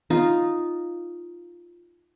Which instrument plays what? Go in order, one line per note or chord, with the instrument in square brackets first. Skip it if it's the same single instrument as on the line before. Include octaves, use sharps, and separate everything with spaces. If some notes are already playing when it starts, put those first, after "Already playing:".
[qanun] D#4 F4